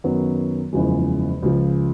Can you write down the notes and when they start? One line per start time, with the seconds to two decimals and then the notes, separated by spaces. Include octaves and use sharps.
0.04 F#2 D#3 F#3 B3
0.73 F#1 E2 C#3 F3 G#3
1.42 C#2 C#3 F3